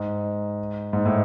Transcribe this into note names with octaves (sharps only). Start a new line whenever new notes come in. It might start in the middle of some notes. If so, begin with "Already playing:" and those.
Already playing: G#2
G#2
A2